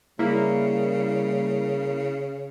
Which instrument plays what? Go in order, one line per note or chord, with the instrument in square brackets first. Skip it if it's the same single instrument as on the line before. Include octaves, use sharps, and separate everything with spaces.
[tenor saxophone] C#3 [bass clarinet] G3 [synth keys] A#3 E4